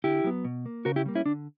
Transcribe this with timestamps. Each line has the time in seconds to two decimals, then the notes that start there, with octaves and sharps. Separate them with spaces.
0.04 D3 E4 G4
0.24 F#3 B3
0.44 B2
0.66 A#3
0.85 C#3 F#4 A#4
0.96 E4 G4
1.06 G3 A#3
1.15 C#4 E4
1.26 D3 D4